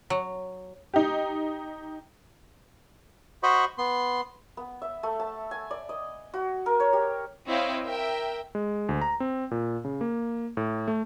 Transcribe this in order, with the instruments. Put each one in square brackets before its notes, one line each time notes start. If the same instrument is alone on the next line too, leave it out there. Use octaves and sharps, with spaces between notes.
[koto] F#3
[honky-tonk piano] D#4 G4
[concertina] F#4 C5 D#5 B5 C#6
B3 C6
[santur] B3
E5
A3
A5
G#5
D5
D#5
F#4
A#4
C#5
G4
[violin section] C4 E4 C#5 D#5 F5 G5
A#4 E5 G5
[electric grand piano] G#3
D2
A#5
C4
A#2
C#3
A#3
A2
A3